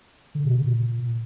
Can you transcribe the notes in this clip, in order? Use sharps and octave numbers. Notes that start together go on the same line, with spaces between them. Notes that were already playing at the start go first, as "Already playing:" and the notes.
D3
B2
C#3
A#2